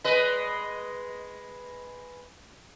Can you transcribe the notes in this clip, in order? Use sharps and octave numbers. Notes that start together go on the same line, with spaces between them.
G#3 B4 D#5